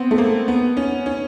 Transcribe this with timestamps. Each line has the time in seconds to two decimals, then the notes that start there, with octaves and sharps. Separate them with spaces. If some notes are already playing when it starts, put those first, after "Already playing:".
Already playing: B3 C4
0.11 A3
0.18 A#3
0.48 B3
0.77 C#4
1.06 C#4